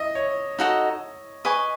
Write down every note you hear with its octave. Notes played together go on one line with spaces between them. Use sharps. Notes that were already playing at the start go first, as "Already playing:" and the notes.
Already playing: D#5 E5
C#5
D#4 F#4 A4 D#5
B4 D#5 G#5 C#6